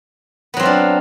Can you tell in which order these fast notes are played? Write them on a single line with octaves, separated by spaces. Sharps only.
B3 F#3 C4 F4 D4